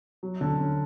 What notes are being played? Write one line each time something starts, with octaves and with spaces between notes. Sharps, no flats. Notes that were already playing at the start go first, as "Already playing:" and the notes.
F#3
D3
C#4